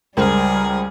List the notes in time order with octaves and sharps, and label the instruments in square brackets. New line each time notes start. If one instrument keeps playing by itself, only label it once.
[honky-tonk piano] C#2 C5 F6 [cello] G3 [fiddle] G#4 [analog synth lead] A#4